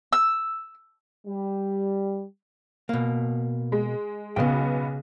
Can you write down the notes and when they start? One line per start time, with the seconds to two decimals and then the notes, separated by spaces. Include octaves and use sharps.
0.13 E6
1.26 G3
2.89 B2 A#3
3.72 G#3
4.36 B1 C#3 B3 G5